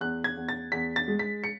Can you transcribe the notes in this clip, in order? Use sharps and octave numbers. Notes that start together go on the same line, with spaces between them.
E2 F#6
G#6
E2
A6
E2 B6
A6
G#3
B6
C#7